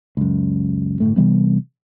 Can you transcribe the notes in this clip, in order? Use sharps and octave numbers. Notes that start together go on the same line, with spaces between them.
C#2 F#2
G1 C#2 A2 A3
C3 E3 G3 B3